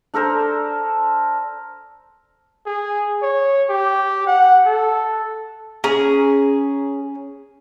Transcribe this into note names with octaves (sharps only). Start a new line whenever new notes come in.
D4 A4 A#4 C5
G#4
C#5
G4
F#5
A4
C#4 G#4 A#5